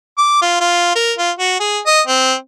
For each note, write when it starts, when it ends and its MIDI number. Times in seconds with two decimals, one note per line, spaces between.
0.18 0.41 86
0.42 0.56 65
0.60 0.95 65
0.96 1.13 70
1.18 1.31 65
1.39 1.56 66
1.60 1.79 68
1.86 2.01 75
2.07 2.34 60